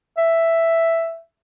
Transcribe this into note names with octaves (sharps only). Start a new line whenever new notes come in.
E5